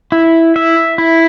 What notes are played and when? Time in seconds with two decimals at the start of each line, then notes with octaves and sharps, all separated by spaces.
0.12 E4
0.56 E5
0.98 E4